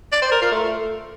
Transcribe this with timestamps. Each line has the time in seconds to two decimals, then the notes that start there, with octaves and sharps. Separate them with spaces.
0.12 D5
0.22 C5
0.32 A#4
0.42 F4
0.51 A3